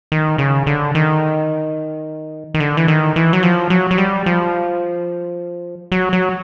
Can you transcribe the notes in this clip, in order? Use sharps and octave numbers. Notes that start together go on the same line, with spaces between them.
D#3
C#3
D3
D#3
D#3
D3
E3
D#3
E3
F#3
F3
F#3
F#3
G3
F3
F#3
F#3